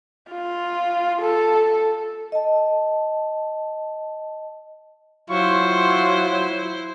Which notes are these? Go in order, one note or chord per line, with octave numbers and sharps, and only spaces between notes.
F4
A4
D#5 A5
F#3 E4 F4 C5 C#6